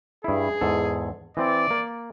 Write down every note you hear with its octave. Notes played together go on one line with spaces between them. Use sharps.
G2 E4 G#4
E2 G#2 A4
E3 C4 D5
A#3